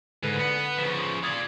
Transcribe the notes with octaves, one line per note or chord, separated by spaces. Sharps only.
G#2 D3 B4 D#7
B3
C#3 F3
F4 D5 D#6 G#6